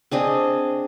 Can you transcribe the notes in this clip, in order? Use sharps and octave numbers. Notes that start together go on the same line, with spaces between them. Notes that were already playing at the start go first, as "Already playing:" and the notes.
C4 D4 G#4 D#5